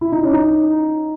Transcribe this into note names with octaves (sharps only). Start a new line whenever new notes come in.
E4
D#4
C#4
D#4